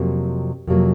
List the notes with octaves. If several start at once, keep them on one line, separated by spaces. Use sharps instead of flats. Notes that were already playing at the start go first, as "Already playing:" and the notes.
Already playing: F2 C3 F#3 A#3
F2 C3 F#3 A#3